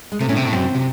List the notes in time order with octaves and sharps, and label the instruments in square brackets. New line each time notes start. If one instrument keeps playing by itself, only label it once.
[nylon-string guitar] G#3
[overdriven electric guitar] C3 [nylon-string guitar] A3
[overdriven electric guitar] A2 [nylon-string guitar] C#4
[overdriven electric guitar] C3 [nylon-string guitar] C4
[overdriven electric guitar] A2
[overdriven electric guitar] F#2 [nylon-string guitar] C4
[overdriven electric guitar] C3